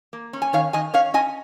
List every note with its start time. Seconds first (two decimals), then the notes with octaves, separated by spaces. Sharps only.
0.13 A#3
0.33 C#4
0.42 G#5
0.53 D#3 C#5 F5
0.73 D#3 D#5 G#5
0.94 C#4 C#5 F5
1.14 C#4 D#5 G#5